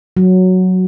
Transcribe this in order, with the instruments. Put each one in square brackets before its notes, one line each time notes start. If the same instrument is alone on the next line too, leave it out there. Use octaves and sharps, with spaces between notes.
[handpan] F#3